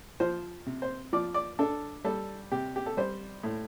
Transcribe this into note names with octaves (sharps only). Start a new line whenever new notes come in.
F3 C5
C3
C5
F3 D5
D5
D4 A4
G3 A4
C3 G4
G4
A4
G3 C5
A2